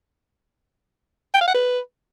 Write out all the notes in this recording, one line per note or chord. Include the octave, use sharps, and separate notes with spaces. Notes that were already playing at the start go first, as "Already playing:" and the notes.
G5
F5
F#5
B4